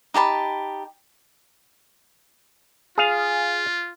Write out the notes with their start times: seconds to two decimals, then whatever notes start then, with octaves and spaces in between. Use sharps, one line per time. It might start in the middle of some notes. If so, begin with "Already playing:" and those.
0.14 D#4 G4 A5 B5
2.98 F4 G#4 F5